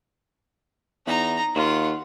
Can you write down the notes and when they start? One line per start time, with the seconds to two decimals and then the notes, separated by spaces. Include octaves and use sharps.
1.06 E2 D#4 A#5
1.55 D#2 F4 F#5